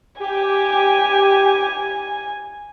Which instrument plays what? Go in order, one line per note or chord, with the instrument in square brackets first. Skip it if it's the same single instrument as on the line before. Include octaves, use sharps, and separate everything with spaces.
[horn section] G4 [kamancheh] G#5